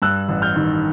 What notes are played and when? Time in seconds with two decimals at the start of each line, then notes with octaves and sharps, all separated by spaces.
0.02 G2 E6 F#6
0.28 A1
0.42 F6 G6
0.56 D#3